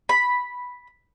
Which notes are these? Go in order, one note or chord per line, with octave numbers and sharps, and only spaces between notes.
B5